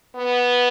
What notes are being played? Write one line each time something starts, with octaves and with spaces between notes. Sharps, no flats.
B3